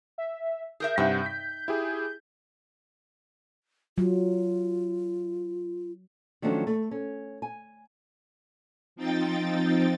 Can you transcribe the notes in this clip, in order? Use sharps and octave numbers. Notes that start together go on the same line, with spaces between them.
E5
G#4 A#4 E5 G6
G2 C3 D#4 E5 F#5 G5
B6
E4 G4 G#4
F#3 F4
D#3 F3 F#3 A3 C#4 D4
A3
C#4
G#5
F3 C4 D#4 G5 A6